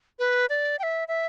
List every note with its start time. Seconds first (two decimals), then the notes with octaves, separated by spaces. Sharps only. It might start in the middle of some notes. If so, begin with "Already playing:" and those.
0.19 B4
0.49 D5
0.79 G5
0.83 E5
1.08 E5